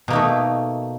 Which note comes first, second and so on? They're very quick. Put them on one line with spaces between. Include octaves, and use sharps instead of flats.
B2 A#3 D#4 A3